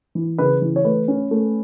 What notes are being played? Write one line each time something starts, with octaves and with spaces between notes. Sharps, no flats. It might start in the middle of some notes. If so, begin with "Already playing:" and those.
E3
C#3 B4
E3
C#5
A3 B4
C#4
A3